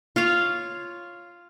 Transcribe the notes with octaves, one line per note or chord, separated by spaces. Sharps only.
F4 C#5 F5